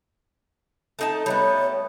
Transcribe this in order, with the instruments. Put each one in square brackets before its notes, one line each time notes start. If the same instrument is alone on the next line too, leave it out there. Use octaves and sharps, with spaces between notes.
[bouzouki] A3 D#4 A5
[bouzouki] G3 A3 B3 [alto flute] C#5